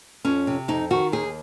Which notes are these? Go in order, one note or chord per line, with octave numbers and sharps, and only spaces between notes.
F2 C#4
C3
F2 D#4
D#3 F#4
D#2 G#4